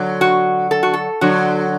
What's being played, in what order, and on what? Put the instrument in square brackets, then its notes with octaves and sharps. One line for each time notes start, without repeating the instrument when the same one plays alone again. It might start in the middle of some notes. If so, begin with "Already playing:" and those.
Already playing: [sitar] D3 F#3
[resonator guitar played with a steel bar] F#4
A4
F#4
A4
[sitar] D3 F#3 [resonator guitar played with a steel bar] F#4